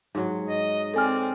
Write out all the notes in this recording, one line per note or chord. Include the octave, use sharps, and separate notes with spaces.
G#2 F#3
D#5
C4 A4 D5 G#5 F6